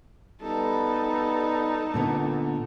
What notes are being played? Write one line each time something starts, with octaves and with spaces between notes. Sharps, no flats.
G3 B3 D#4 A4
A#2 D3 B3